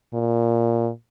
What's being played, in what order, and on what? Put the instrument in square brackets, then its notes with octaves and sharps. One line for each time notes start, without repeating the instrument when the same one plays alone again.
[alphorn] A#2